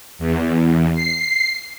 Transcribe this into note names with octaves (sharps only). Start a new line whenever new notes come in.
E2
C7